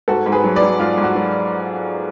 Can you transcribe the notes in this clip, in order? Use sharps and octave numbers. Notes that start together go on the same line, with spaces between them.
G#2 F#4 A4
G#2
G#4 B4
F#3
B4 D5
F#3
G#2 F4
G#2
F#4
F#3